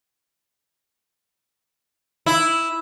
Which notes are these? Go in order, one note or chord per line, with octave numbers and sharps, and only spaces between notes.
E4